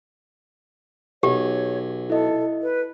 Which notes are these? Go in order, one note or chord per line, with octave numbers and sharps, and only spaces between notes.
B1 G4 C#5
E4 A4 D#5
B4